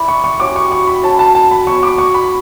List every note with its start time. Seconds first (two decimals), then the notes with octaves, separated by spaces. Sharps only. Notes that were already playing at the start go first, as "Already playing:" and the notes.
Already playing: E4 B4 D5
0.08 C#6
0.24 C#6
0.40 F#3 C#4 G4 D6
0.56 C#6
0.72 C#6
0.87 B5
1.03 F#3 C#4 F#4 B4 A5
1.19 A5
1.35 A5
1.51 B5
1.67 B3 F#4 C#5 C#6
1.83 D6
1.98 C#6
2.14 B5